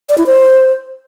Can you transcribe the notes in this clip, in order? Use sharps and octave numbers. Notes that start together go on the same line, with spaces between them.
D5
E4
C5